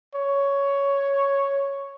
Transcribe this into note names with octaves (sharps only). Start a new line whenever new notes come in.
C#5